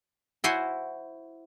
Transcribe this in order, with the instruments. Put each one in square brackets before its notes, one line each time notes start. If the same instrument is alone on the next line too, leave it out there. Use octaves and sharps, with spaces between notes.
[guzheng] E4 F#4 C5 F#5 G#5